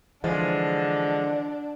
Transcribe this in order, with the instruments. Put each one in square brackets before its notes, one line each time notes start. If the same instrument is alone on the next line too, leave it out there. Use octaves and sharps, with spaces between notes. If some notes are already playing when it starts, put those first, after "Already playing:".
[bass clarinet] D3 [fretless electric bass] E3 [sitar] F3 G#3 [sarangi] D4